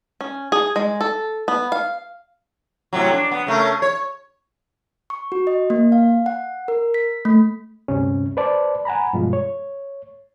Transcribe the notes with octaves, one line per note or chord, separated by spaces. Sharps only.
C#4
G#4
G#3
A4
B3
F5
A2 C3 F#3
D4
B3
C#3 A3 A#4
C#5
C#6
F#4
D#5
A#3
F5
F#5
A#4
B6
A3
D2 G2 C3 C#4
B4 C5 D5 A5
F#5 G#5 A#5 B5
G2 B2 F3 G#3 F4
C#5